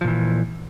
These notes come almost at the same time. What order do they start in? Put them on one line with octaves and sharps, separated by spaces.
F3 A#2 E3